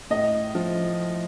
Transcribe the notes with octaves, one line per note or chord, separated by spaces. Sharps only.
A2 D#5
F3